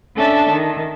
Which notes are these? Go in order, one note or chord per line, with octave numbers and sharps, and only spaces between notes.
C#4 D4 A4 E5 A5
D#3